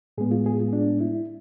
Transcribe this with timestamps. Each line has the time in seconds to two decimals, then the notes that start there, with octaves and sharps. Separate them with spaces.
0.18 A2 G#3 B3 G#4
0.31 F4
0.46 G#4
0.59 F4
0.73 D4
1.01 E4